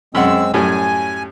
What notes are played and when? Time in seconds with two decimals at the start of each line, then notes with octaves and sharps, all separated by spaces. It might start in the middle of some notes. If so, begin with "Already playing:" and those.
0.15 F#2 G#3 C4 F#5 E6
0.54 F#2 A2 G3 G#5